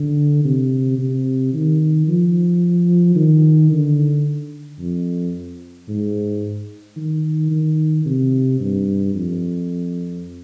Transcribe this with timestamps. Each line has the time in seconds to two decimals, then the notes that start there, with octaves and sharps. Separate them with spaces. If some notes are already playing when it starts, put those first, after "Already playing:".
Already playing: D3
0.45 C3
0.98 C3
1.54 D#3
2.08 F3
3.16 D#3
3.71 D3
4.79 F2
5.88 G#2
6.97 D#3
7.51 D#3
8.06 C3
8.60 G2
9.14 F2